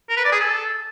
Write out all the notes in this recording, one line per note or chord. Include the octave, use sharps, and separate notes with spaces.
A#4
B4
D5
G#4
A4